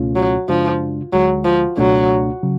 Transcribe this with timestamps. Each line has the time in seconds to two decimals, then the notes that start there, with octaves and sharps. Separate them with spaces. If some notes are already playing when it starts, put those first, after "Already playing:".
Already playing: C#2 B2 A3 C#4 F4
0.16 F#3
0.49 F#2 C#3 F3 G#3 D4 F4
1.13 D2 D3 F#3 G#3
1.45 F3
1.77 C#2 B2 F#3 A3 D4
2.43 C#3 F#3